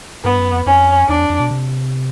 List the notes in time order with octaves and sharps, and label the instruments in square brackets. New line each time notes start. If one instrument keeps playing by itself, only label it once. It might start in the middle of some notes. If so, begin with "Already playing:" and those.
[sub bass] G2 [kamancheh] B3
[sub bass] F#2
F2
[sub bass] F2 [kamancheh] C#4
[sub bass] E2 [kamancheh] D4
[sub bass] F2
F2
B2
C3